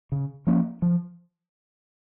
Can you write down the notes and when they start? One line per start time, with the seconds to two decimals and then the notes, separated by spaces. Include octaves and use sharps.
0.12 C#3
0.47 F3 A#3 C#4
0.82 F3